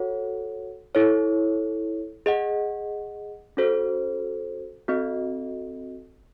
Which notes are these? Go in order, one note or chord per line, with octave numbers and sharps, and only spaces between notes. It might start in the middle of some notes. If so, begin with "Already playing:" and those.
Already playing: F#4 A4 C#5 F#5
E4 A4 C#5
G#4 D#5 F#5
C#4 F#4 A4 C5
C4 F#4 A4 D#5